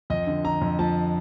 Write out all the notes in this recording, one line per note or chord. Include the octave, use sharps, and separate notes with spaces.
F2 D#5
D3
D3 A#5
F2
F3 A5